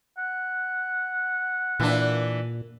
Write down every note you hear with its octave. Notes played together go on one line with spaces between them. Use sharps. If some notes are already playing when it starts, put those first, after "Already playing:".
F#5
A#2 E3 D4